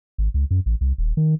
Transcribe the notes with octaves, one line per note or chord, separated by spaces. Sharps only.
G#1
C#2
F#2
A1
C2
D#1
D#3